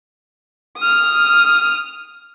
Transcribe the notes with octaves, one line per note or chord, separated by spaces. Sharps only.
D#6 F6